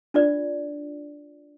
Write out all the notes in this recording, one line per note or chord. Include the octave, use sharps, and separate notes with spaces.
D4 F4 D5